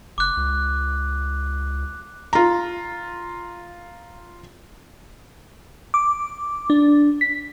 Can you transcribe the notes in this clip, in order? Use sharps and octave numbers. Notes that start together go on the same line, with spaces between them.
F#1 D6 F#6
C#2
F4 A#5
D6
D4
B6